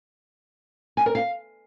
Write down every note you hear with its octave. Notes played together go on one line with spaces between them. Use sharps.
G#5
A#4
F5